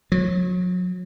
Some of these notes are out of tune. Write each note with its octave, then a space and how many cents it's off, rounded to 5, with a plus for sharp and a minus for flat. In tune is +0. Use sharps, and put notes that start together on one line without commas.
F#3 -35